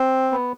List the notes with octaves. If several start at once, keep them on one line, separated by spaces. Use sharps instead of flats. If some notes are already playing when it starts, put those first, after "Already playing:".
Already playing: C4
B3